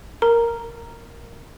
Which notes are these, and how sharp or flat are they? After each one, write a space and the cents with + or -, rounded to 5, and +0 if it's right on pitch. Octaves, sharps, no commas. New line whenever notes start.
A#4 +0 A#5 +0